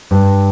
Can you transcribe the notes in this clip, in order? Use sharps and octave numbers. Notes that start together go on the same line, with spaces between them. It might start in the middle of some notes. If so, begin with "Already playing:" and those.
G2